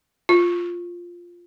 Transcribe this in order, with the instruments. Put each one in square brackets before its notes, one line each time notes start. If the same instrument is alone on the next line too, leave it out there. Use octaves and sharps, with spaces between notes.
[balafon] F4